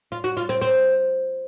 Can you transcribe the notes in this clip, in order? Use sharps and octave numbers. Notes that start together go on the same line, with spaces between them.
F4
F#4
F4
C4
C4